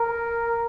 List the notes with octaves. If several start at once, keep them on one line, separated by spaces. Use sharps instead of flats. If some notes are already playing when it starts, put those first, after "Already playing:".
Already playing: A#4